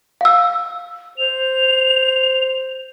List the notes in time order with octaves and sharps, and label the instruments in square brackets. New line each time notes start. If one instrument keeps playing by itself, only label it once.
[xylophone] F5 E6
[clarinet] C5 [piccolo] F7